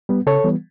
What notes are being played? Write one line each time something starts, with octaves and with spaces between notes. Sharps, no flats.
G3 B3
C#3 A4 C#5
E3 G3 B3